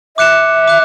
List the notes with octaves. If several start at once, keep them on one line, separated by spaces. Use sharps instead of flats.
E5 D6 F#6 C#7 E7
D6 F#6